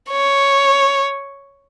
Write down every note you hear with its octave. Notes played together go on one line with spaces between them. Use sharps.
C#5